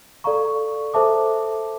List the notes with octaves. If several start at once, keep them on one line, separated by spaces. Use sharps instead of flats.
A4 D5 F5 A#5 C#6
A4 C5 E5 A5 D6